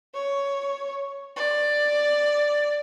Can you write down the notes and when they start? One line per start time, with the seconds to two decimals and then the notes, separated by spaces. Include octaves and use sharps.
0.14 C#5
1.36 D5